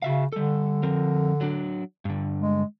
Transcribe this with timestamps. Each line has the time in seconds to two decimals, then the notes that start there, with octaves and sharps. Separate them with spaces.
0.02 C#3 F#4 E5 F5
0.33 D3 G3 A4
0.83 F3 C4 A#4
1.41 F#3 D4
2.05 G2 D3
2.39 G#3